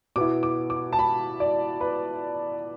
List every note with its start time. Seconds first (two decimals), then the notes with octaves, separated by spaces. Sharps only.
0.16 B2 B3 E4 D6
0.43 D6
0.70 D6
0.93 A5
0.99 B5
1.40 D5
1.81 B4